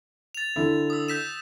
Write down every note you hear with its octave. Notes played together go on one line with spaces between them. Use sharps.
A6 F7
D3 E4
D#6 E6
G6 B6 E7